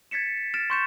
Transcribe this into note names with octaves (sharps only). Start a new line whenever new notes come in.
G#6 A6 B6 C#7 E7
F6 A6 D7 E7
C6 C#6 G6 C#7 E7